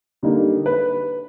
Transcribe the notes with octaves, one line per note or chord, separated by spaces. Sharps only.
D3 G3 A#3 D#4
B4